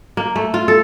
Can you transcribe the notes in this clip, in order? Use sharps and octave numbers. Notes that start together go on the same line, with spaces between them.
A#3
A3
F4
A4